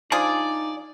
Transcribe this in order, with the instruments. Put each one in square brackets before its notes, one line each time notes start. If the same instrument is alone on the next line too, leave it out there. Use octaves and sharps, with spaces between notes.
[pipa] F3 D4 G#4 [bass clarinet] D#4 [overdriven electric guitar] D5